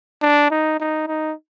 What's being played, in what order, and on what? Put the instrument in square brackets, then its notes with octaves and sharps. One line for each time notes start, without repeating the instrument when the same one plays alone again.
[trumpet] D4
D#4
D#4
D#4